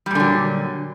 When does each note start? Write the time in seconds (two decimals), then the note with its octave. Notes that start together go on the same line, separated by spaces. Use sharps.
0.06 G3
0.11 A#2
0.15 D3
0.20 F#3